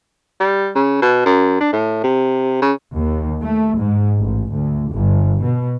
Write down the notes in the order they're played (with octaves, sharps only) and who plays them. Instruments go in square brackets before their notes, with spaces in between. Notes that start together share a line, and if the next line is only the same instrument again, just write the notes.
[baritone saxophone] G3
C#3
B2
F#2
D4
A2
C3
C#3
[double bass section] D#2
A3
G#2
A1
D2
G1
B2